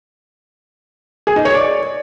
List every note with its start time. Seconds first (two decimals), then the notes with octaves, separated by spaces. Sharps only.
1.27 G#4
1.36 D#4
1.45 C#5
1.54 D5